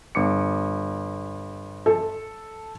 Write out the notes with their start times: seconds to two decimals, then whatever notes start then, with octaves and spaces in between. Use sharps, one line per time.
0.15 G1 D6 C#7
1.86 A4